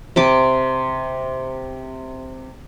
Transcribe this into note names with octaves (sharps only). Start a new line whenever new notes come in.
C3 A5 D6